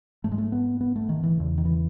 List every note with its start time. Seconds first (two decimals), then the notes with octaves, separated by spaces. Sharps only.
0.24 G#2 A3
0.32 G#3
0.38 A3
0.52 B3
0.81 B3
0.96 A3
1.09 D#3
1.23 E3
1.37 E2 C#3
1.58 D#3
1.65 E3